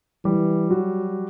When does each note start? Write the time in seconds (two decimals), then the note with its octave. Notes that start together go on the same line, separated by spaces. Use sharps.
0.25 E3 G3
0.71 F#3 F#4